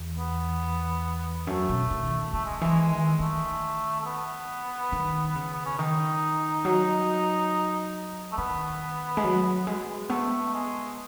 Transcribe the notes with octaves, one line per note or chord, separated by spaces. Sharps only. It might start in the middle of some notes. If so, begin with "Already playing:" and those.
Already playing: E2
B3
F#2 A3
B2
D#3
C#3 A3
G#3
E3
G#3
D#3
D#3 A3
A3
B3
D#3
C#3
B3
C#4
D#3 D#4
F#3
A3
D#3 B3
G#3
F#3
G#3
A3 B3
G#3